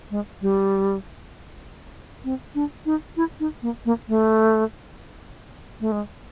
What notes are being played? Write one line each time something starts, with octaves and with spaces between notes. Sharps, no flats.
G#3
G3
C4
D4
D#4
E4
D#4
A#3
A#3
A3
A3
G#3